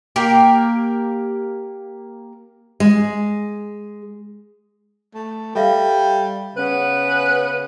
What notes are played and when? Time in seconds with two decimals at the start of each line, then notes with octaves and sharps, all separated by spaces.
0.16 A#3 G4 A#4
2.80 G#3
5.14 A3
5.55 G3 A4 E5 F5
6.56 C#3 B3 C#4 B4